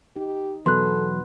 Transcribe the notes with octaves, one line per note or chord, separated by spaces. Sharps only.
D#4 G4
E2 B2 F#3 B3 A4 B4 C6 F#6